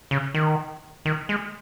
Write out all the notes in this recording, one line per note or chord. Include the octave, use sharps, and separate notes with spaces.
C#3
D#3
D#3
G#3